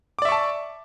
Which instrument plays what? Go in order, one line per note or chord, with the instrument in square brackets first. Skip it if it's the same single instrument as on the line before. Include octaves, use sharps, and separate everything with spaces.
[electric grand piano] D6
D5
E5
C#6
A5